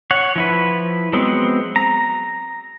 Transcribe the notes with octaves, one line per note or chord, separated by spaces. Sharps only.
C#5 F#5
F3 E4 B4
F#3 G#3 B3 C4
A#5